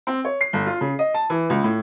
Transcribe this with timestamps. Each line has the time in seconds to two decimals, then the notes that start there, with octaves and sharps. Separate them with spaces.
0.07 C4
0.25 C#5
0.41 C7
0.53 G1
0.66 F4
0.81 C#3
0.99 D#5
1.14 A5
1.30 E3
1.50 C#2
1.64 A2